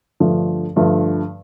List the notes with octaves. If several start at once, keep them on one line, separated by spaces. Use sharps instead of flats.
G2 D3 F3 A3
G2 D3 F3 A3